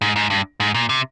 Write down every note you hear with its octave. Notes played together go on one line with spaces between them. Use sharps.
G#2
G#2
G2
G#2
A#2
C3